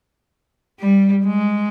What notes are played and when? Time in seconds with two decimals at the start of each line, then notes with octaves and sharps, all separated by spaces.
0.80 G3
1.25 G#3